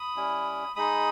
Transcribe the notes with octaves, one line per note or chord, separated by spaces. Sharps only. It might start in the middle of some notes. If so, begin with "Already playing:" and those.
Already playing: B5 D#6
G3 C#4 E4
G#3 D#4 B5 D#6